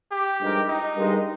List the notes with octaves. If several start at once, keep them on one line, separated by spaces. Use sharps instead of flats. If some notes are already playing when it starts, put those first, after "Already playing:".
G4
G2 F3 G#3 D#4 A#4
D#4
G2 D#3 G#3